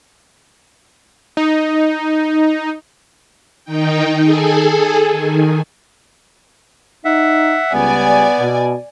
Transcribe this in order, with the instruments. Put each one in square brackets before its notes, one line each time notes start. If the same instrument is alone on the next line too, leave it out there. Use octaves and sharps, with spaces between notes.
[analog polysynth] D#4
[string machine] D#3 D#4 G5
G#4 A4 G#5
D#3
[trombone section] D#4 [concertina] E5 F#5
[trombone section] C#2 G3 [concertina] B3 [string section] D5 G#5
[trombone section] B2